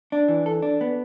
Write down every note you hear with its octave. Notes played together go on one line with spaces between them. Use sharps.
D4
E3
A4
D4
B3